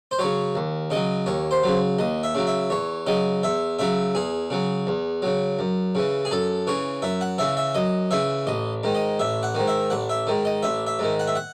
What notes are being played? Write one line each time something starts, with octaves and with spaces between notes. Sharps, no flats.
C5
C#3 F#3 C#5
D#2
C#3 F#3 D#5
D#2 C#5
C5
C#3 F#3
D#2 D#5
E5
C#3 F#3
E5
E2 C#5
C#3 F#3 D#5
E2 E5
C#3 F#3 E5
E2 G#4
C#3 F#3
E2
C#3 F#3
F#2
C#3 E3
G#4
F#2 A4
C#3 E3 C#5
F#2 E5
F#5
C#3 E3 E5
E5
F#2 D#5
C#3 E3 E5
A1 D#5
G#2 D#3
D#5
A1 E5
F#5
G#2 D#3
E5
A1 F#5
E5
G#2 D#3
D#5
A1 E5
E5
G#2 D#3
F#5
E5
F#5